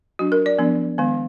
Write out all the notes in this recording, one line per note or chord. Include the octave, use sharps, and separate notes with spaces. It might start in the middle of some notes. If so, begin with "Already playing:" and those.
F#3 D4 F#4
A#4
D5
F3 B3 D4
D#3 G#3 B3